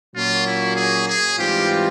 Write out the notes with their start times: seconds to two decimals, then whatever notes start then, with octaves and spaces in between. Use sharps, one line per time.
0.15 A#2 F#3 A#3 C#4 F4 F#4
0.47 E4
0.76 G#4
1.08 G#4
1.38 G#2 E3 G3 C4 F4 G4